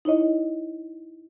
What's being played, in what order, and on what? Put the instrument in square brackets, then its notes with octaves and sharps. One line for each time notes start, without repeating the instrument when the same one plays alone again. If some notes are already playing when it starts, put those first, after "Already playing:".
[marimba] D#4 E4 C#5 D#5